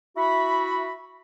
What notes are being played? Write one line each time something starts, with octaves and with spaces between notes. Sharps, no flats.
E4 F#4 B5